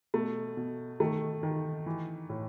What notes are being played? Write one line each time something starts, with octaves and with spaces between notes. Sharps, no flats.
B2 A3
B2
D#3 A3
D#3
E3
A2